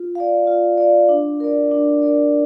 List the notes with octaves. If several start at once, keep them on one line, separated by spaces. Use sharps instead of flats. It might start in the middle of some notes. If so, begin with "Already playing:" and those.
Already playing: F4
D5 F5
F4
D5 F5
D4
A#4 D5
D4
A#4 D5